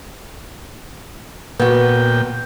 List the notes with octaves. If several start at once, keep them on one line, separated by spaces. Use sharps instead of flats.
A#2 B3 F#4 G5